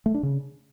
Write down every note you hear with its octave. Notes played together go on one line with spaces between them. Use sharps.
A3
D4
C#3